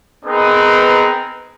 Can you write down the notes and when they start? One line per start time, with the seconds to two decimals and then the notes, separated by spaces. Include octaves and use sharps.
0.25 B3 C4 D#4 G#4 A#4 B4